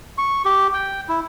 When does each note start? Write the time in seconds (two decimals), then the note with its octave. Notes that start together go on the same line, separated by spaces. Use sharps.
0.18 C#6
0.45 G4
0.74 G5
1.09 E4